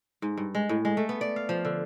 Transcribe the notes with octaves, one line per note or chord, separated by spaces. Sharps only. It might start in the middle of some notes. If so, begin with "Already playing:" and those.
G#2
G2
G#3
A2
G#3
A3
B3
D5
F5
F3
D3